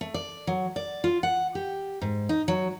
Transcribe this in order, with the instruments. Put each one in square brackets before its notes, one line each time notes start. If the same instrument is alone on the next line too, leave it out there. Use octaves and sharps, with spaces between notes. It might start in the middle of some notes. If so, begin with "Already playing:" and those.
[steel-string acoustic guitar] A3
D5
F#3
D5
F4
F#5
G4
G#2
D#4
F#3